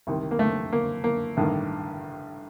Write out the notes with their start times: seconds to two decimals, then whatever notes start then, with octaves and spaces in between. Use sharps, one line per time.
0.07 C2 C3 D#3
0.31 A#3
0.39 A3
0.73 A#3
1.04 A#3
1.37 A1 G2 D#3